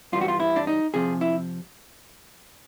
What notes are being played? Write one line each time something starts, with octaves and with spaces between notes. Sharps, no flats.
G2 E3 G3 F4
F#4
F4
E4
D4
D#4
F2 C3 F3 G#4
E4